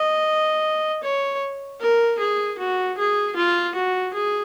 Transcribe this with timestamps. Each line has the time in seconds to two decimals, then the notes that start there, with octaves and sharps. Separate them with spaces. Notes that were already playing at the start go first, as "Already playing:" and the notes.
Already playing: D#5
1.03 C#5
1.81 A#4
2.19 G#4
2.59 F#4
2.98 G#4
3.36 F4
3.75 F#4
4.14 G#4